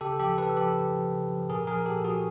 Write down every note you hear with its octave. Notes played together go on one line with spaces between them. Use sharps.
C#3 G4 A4
F3 G4 A4
C#3 A4 B4
F3 G4 A4
C#3
F3
C#3
F3
A#2 G#4 A#4
F3 G#4 A#4
A#2 G4 A4
F3 F#4 G#4